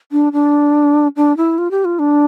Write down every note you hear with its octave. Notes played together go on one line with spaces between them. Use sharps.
D4
D4
D4
E4
F4
G4
F4
D4